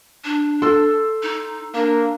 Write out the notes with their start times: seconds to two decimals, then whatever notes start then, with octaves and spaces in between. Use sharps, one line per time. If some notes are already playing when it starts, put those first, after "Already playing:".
0.24 D4
0.62 A4 C6 E6
1.23 D#4
1.74 A#3 D4